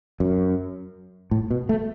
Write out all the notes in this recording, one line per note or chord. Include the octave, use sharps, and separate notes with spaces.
F#2
A2
B2
A3